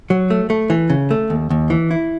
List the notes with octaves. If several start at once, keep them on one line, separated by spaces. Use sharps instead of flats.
F#3
A3
A3
E3
C#3
A3
D#2
D#2
E3
E4